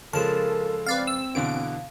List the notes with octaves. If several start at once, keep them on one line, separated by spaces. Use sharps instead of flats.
C#3 F3 G#3 A4 A#4 A5
C4 B4 D5 F5
E6
B2 D3 E3 F5 D7